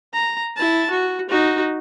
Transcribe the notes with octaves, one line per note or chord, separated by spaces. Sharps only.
A#5
E4 A5
F#4
D#4 F#4